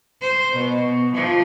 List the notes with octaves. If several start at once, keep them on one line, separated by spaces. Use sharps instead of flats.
C5
B2
F3